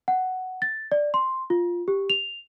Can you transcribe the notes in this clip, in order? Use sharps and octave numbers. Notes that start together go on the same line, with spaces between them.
F#5
A6
D5
C6
F4
G4
F7